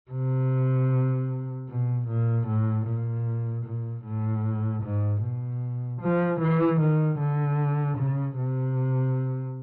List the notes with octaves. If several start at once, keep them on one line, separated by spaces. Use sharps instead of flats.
C3
B2
A#2
A2
A#2
A#2
A2
G#2
B2
F3
E3
D#3
D3
C#3
C3